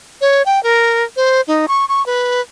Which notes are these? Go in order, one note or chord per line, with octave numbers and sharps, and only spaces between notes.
C#5
G5
A#4
C5
D#4
C#6
C#6
B4